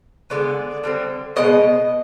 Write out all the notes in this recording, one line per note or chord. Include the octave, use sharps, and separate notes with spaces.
D3 G#3 B3 D5
D3 G3 C4
B2 G#3 B3 D#5